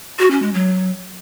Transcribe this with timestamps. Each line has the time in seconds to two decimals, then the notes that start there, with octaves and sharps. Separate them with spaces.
0.19 F#4
0.31 C#4
0.42 G#3
0.54 F#3